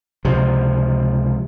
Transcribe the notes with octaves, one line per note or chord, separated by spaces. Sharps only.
C#2 C3 F3